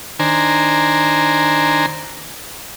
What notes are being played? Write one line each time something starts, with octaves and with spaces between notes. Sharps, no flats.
D#3 D4 C5 G#5 A#5